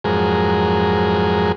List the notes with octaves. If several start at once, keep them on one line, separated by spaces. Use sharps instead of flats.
F2 G#2 F#3 G#3 G#4 A#4